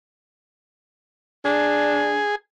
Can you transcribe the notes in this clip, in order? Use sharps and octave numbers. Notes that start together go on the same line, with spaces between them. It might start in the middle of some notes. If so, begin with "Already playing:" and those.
D4 G#4